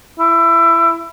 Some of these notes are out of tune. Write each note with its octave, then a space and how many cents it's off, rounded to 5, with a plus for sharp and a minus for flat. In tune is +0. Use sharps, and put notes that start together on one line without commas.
E4 +20